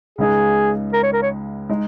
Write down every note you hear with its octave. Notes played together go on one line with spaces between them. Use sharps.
C#2 C#3 G#3 D#4 G#4
A#4
C#5
A#4
C#5
G#3 D#4